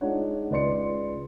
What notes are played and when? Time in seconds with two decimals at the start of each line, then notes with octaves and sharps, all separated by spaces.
0.01 G#3 D4 D#4 F4 C#5 F#5
0.51 C#2 B4 D5 C6 C#7